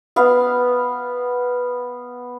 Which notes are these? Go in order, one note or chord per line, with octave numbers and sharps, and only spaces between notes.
B3 F5